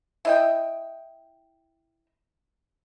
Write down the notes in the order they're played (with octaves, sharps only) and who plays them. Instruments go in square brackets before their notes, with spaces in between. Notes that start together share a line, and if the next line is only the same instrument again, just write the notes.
[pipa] E4 D#5 G5